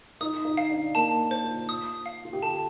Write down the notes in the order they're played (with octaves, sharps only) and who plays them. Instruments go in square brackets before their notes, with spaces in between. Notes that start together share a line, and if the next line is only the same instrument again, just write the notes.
[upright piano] D#4 [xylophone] D#6
[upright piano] D#4
[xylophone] F5
[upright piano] D4
[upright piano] A#3 [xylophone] A5
[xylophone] C5
[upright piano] F4
[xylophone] D#6
F5
[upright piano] F4
G4
[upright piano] A4 [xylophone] A5